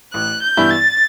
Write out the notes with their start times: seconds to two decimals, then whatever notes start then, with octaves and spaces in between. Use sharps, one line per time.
0.14 A1 F#6
0.43 G6
0.57 G2 E3 B3 E4
0.71 A6